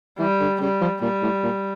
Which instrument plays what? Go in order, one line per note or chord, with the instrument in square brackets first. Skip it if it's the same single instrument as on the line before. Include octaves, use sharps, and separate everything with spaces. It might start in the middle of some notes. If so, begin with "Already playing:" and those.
[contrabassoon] E3 [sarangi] G3
[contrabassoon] D3
[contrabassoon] C#3 [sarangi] G3
[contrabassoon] F3
[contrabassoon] A#2 [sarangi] G3
[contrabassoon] A2
A#2